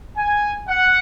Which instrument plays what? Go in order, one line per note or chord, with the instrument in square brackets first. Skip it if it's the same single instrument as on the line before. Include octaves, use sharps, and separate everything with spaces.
[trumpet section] G#5
F#5